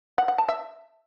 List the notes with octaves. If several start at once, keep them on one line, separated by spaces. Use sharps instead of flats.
F#5
F#5
A5
E5